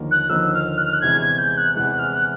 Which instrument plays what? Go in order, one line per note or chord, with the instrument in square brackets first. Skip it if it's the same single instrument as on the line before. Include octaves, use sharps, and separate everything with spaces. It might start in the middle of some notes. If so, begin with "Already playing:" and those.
Already playing: [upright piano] D#2 D3 F3 A#3 D#4
[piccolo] F#6
[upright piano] D#2 D3 F3 A#3 D#4 [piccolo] E6
[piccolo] F6
F#6
F6
F#6
[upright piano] E2 C3 E3 G#3 [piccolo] G#6
[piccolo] G#6
G6
F#6
[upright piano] E2 C3 E3 G#3 [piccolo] F#6
[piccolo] F6
F#6